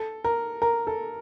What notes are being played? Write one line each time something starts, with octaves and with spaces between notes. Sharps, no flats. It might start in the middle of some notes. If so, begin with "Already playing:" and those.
Already playing: A4
A#4
A#4
A4